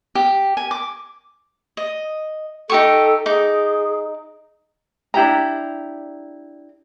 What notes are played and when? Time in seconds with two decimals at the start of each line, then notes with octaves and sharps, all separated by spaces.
0.15 G4
0.57 G#5
0.71 D6
1.77 D#5
2.70 D#4 G4 A4 C#6
3.26 D#4 G#4 D6
5.14 D4 E4 G4 A#5